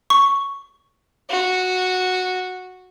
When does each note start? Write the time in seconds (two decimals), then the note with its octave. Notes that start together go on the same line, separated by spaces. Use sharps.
0.10 C#6
1.29 F#4